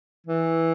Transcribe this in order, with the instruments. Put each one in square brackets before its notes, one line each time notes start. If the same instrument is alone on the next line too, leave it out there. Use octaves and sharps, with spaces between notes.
[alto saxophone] E3